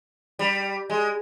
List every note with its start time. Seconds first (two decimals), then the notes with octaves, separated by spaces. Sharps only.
0.39 G3
0.90 G#3